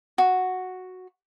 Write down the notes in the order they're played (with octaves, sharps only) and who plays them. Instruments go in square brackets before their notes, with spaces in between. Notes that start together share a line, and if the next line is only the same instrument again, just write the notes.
[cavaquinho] F#4